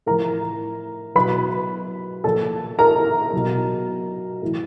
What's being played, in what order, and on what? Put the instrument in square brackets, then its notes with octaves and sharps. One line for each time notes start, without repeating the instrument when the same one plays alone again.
[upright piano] A2 F3 A#4 A#5
B2 F#3 B4 B5
A#2 F3 A4 A5
A#4 A#5
B2 F#3
A2 E3